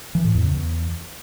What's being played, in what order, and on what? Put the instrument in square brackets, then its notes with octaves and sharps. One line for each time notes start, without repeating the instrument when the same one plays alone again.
[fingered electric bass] E3
A2
E2
C#3
E2